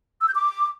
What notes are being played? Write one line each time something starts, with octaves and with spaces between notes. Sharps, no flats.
E6
G6
D6